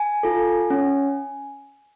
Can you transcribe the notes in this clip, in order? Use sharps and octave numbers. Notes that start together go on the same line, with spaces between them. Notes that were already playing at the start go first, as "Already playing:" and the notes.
Already playing: G#5
F4 A4
C#4